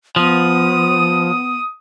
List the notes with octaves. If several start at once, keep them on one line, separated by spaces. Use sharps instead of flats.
F3 B3 D#6